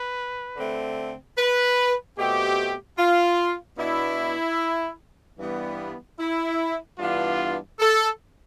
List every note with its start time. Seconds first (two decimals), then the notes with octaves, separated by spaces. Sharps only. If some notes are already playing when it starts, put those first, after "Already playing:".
Already playing: B4
0.57 D3 A3 C4
1.36 B4
2.16 B2 A3 C4 G4
2.97 F4
3.77 B2 B3 D4 E4
5.38 G2 E3 G3 B3
6.18 E4
6.99 G2 E3 B3 D4 F4
7.79 A4